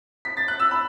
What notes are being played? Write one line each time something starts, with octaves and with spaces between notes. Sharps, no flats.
B6
A6
F#6
E6
B5